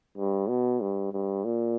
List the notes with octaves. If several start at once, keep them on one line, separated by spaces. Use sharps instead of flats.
G2
B2
G2
G2
A#2